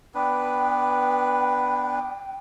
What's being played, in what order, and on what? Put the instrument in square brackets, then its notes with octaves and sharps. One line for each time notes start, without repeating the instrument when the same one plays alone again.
[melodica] B3 D4 B4 [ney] G5